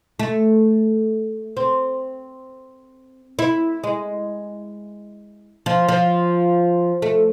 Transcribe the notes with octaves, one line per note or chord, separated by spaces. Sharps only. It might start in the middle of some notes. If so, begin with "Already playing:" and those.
A3
C4
E4
G#3
F3
F3
A3